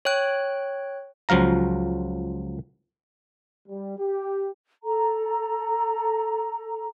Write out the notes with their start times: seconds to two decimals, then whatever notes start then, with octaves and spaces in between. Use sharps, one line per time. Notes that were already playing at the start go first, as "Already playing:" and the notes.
0.05 C#5 G5 F#6
1.29 C#2 F3 F#3 F5 A#5
3.67 G3
3.98 G4
4.83 A4 A#5